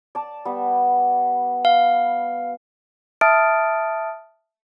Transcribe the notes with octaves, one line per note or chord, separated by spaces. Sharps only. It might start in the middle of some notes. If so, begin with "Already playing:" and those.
D5 A5
G3 B3
F5
E5 A5 D#6 F6 A6 D7